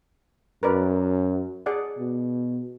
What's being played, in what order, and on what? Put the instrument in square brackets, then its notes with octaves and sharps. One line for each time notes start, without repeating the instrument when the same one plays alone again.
[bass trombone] F#2 [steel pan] A#4 B4 D5
[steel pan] G#4 D5 F#5
[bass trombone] B2